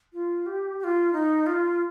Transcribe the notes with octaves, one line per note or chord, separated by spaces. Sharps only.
F4
G4
G4
F4
D#4
F4